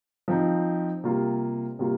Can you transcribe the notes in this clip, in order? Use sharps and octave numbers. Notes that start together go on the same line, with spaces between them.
F3 C4 D#4
C3 G3 A#3 F4
C3 G3 A#3 F4